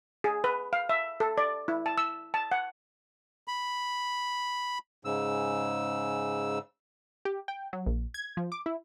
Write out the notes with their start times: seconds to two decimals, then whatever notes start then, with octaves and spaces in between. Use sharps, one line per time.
0.24 G#4
0.44 B4
0.73 F5
0.89 E5
1.20 A4
1.38 D5
1.68 E4
1.86 A5
1.98 E6
2.34 A5
2.52 F#5
3.48 B5
5.05 G#2 C#3 E6
7.25 G4
7.48 G5
7.73 F#3
7.86 A#1
8.14 G#6
8.37 F3
8.52 D6
8.66 E4